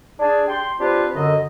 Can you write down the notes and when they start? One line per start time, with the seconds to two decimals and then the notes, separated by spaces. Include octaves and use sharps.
0.18 D4 G#4
0.48 G5 C6
0.79 C4 D4 F4 G4 B4 C5
1.14 F#2 D3 D#5